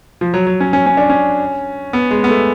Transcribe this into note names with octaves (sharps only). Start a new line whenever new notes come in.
F3
F#3
F#3
C#4
C#4
C#4
D4
C#4
B3
G#3
B3
A3